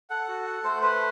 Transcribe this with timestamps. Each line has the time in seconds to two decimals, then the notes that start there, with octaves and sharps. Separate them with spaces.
0.10 A4 F#5
0.28 F#4
0.47 F#5
0.64 A3 C5
0.82 B4 C5